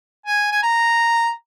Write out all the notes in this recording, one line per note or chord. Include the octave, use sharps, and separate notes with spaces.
G#5
G#5
A#5